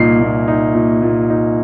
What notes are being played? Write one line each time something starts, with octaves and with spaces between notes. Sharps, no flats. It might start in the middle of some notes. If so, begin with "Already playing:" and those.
Already playing: C2 A#2 D#4 C7
A#2
D#4
A#2
A#2
D#4